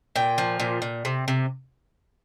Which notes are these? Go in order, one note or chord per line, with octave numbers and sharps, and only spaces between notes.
A#2 G5
F3
A#2
A#2
C3
C3